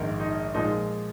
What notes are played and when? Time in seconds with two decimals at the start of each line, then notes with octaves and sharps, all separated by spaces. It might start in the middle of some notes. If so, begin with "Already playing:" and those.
Already playing: A#1 G#2 D#3 A#3
0.20 D#4
0.54 A#2 F3 G#3 D#4